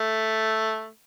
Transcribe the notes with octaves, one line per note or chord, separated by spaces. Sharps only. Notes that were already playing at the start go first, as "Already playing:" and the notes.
Already playing: A3